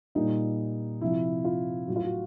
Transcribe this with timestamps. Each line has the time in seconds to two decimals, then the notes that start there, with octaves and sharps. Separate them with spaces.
0.15 A#2 G3 D#4
1.01 C3 F3 E4
1.44 F4
1.88 A2 F#3 F#4
1.96 F4
2.04 F#4